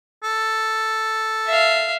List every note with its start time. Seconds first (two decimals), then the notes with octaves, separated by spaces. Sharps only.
0.23 A4
1.46 E5 F5